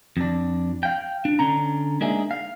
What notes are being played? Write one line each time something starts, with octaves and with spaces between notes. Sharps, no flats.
F2 D4
F5 G5
D4
D3 C#4 A#5
G#3 A#3 D4 D#4 G#4 E5
F5